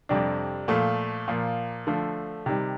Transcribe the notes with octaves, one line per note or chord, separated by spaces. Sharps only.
F2 C3 G3 D4
A#2 F3 A3
A#2 F3 A#3
D3 F3 A3
C3 D#3 G3